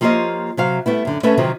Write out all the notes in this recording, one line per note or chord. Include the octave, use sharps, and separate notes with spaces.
F3 A#3 F4 G4 C#5 D#5
C3 F#3 F5
G3 A3 B3 E4
F#2 D3
A3 C#4 A4 B4 C#5 E5
C3 D#3 F3 F#3